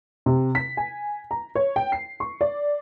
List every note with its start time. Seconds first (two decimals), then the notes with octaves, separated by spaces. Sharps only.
0.26 C3
0.55 B6
0.77 G#5
1.31 A#5
1.55 C#5
1.76 G5
1.92 C7
2.20 C#6
2.41 D5